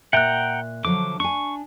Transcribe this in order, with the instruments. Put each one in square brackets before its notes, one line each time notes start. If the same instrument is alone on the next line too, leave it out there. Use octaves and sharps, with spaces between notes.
[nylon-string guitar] A#2 [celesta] E5 F#6 [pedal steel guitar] F#5 G5 A#5
[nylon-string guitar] D3 F3 F#3 [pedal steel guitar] D6
[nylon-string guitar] D4 G#5 [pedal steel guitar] C#6